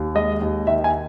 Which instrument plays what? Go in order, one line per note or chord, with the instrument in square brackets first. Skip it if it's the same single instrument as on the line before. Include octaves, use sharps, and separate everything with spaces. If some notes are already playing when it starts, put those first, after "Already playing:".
Already playing: [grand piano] D#2
G#3 D#5
D#2
D#3 E5
G#5